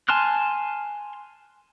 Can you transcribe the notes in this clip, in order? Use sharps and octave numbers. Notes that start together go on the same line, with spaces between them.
G#5 A5 C6 F6 F#6